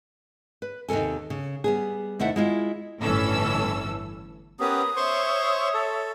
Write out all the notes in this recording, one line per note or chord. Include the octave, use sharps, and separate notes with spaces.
B4
D#2 C3 F3 A4 G#5
C#3
G3 B3 G#4
D#2 C3 A3 E4 E5 F#5
G#3 E4 F4
G1 A2 E3 C#4 A4 E6
B3 C#4 G4 A#4 B4 D#6
C5 C#5 E5 C6 C#6
A4